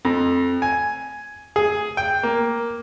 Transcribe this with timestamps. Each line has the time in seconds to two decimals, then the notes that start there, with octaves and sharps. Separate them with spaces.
0.05 F2
0.62 G#5
1.56 G#4
1.97 G5
2.23 A#3